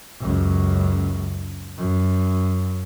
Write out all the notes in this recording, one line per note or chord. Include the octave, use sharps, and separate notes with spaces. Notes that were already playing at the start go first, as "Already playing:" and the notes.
C#2 F#2
F#2